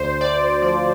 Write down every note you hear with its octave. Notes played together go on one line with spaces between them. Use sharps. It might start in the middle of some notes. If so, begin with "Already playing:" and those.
Already playing: D2 C5
D2 D5
F3 D5